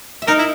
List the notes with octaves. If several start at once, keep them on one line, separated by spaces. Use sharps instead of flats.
E5
D#4 A#4 D#5
E4